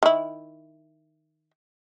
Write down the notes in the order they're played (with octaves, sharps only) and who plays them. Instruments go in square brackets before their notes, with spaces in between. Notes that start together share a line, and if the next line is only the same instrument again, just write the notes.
[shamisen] D#3 E4